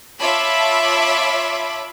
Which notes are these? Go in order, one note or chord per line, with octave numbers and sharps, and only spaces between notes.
F4 C#5 E5 A5 B5 D6